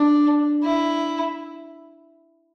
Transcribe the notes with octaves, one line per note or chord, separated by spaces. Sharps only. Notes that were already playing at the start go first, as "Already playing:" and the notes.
Already playing: D4
E4